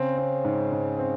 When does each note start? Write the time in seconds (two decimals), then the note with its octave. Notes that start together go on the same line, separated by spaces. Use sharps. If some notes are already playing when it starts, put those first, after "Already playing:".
Already playing: C#3 C4
0.18 C4
0.45 G#2
0.72 G#2
0.99 C4